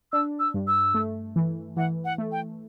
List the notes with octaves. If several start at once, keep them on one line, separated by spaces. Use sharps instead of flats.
D4 E6
E6
G2
E6
A3
E3
E3 F#5
F#5
A3
G5